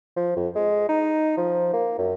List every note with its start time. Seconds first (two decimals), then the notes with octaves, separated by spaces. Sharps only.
0.16 F3
0.37 F2
0.55 G#3
0.89 D#4
1.37 F3
1.73 A#3
1.98 F#2